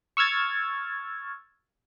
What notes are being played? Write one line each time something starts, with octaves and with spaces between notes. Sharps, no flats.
C#6 E6 F6 G#6 A6